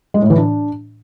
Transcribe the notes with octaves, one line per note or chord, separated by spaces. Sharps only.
G#3
A2
E3
D4